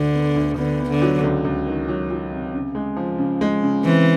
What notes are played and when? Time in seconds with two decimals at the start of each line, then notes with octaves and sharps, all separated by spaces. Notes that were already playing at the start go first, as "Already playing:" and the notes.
Already playing: D2 D3
0.14 B3
0.36 D2
0.58 D3 B3
0.80 B3
0.90 D3
1.02 F#3
1.23 C#2
1.45 C#2
1.66 D#3
1.88 F#3
2.11 F#3
2.32 C3
2.54 C#3
2.75 G#3
2.96 F3
3.18 C#3
3.41 G#3
3.63 C#3
3.85 E3 C4